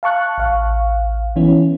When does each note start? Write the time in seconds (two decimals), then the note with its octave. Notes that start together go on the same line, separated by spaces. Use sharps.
0.03 F5 A5 C#6 F#6
0.38 A1 F5
1.36 E3 B3 C#4 E4